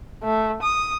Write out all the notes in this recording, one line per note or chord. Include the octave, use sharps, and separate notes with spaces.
A3
D#6